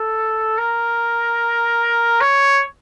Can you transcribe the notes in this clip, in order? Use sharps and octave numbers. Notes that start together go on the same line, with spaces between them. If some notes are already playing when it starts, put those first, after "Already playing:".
Already playing: A4
A#4
C#5